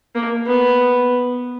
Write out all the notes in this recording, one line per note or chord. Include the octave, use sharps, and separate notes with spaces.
A#3
B3